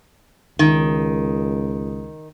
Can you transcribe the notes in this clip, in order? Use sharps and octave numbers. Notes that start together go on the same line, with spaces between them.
C#2 D#3